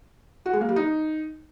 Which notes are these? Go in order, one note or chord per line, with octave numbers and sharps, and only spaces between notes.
F#4
G#3
A#3
G3
D#4